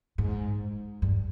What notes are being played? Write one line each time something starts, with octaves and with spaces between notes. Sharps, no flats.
G#2
G2